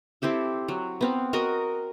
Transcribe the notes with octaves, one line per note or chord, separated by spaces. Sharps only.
C4 E4 G4 A4
F#3
B3 C4 F5
F#4 A#4 D#5